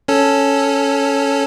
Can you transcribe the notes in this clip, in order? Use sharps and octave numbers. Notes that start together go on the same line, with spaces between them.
C#4 A4